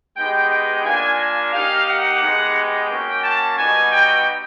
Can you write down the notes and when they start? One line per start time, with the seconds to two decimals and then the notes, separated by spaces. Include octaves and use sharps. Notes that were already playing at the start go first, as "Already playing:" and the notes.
0.17 G#3 B3 D#4 G4 G5
0.50 G5
0.85 A#3 D4 F4 G#5
1.20 G#5
1.53 A#3 D#4 G4 F5
1.88 F#5
2.22 G#3 B3 D#4 G4
2.55 G5
2.90 A#3 C#4 F#4
3.23 A5
3.58 G3 B3 D#4 F#4 G#5
3.91 G5